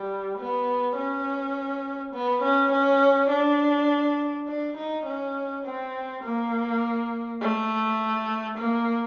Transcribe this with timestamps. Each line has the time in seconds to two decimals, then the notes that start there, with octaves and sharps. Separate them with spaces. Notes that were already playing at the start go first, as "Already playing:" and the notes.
Already playing: G3
0.39 B3
0.96 C#4
2.13 B3
2.43 C#4
2.72 C#4
3.30 D4
4.48 D4
4.77 D#4
5.06 C#4
5.65 C4
6.24 A#3
7.41 A3
8.58 A#3